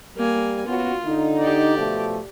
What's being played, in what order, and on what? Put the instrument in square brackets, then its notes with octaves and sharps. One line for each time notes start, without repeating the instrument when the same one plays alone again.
[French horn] G3 [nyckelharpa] A#3 G#5
[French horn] B3 [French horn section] C#4 F#4 [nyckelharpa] F4
[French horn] D3 [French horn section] D#4
[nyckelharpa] G4 D5
[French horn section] B2 F3 A3